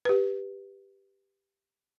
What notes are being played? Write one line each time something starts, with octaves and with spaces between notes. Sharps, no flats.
G4 B4